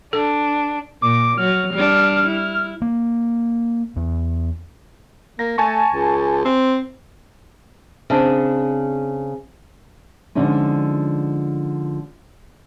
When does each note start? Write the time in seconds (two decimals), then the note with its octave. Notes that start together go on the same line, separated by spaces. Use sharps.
0.13 D4 A4
1.02 A#2 D6
1.38 F#3 F6
1.74 G3 D4
2.27 E4
2.82 A#3
3.96 E2
5.39 A#3 A#6
5.58 A3 G#5 A5 C#6
5.92 C#2
6.45 C4
8.10 C#3 C4 D4
10.35 D3 F3 G#3 C#4 D#4